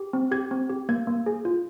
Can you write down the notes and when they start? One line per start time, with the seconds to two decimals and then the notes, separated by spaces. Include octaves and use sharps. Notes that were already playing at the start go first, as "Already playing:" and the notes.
Already playing: G4
0.13 C4
0.31 G4 G#6
0.51 C4
0.69 G4
0.89 A#3 G#6
1.07 A#3
1.26 G#4
1.45 F4